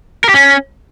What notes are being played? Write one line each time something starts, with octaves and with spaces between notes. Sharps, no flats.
A#4
G4
C#4